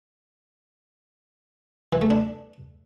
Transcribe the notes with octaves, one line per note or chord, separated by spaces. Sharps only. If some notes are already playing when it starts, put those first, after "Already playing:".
E3
A3
D4